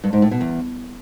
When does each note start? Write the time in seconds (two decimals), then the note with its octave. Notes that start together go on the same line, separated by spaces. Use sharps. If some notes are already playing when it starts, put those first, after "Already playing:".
0.04 G2
0.13 G#2
0.22 A2
0.31 B2
0.41 E2